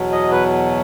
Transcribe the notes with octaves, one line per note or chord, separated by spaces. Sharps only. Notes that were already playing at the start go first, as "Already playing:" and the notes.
Already playing: E2 B2 F#3
D#5
B4